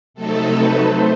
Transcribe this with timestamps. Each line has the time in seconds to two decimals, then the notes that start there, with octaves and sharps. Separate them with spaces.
0.14 C3 F#3 A3 D#4 A4
0.50 B4
0.85 A3 C5